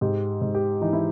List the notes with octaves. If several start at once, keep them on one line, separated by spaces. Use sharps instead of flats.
G#2 G4
G#2
G4
E3 D#4
E4